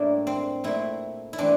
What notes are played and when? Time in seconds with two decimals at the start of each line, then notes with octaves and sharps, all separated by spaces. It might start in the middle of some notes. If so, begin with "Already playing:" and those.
Already playing: A2 G3 A#3 D4 E4
0.27 C4
0.64 A#2 A3 C4 E4
1.33 E4
1.38 E3 A3 C4 D4